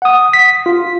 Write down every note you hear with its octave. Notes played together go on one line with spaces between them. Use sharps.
F#5 D#6
B6
F4